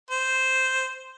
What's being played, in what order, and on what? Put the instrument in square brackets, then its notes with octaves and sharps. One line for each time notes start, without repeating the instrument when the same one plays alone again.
[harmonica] C5